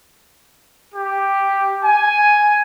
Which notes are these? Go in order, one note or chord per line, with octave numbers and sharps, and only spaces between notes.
G4
G#5